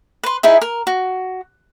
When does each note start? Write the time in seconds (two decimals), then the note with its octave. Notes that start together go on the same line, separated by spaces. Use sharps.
0.23 B4 C6
0.43 D#4 E4 G#4 E5
0.62 A#4
0.87 F#4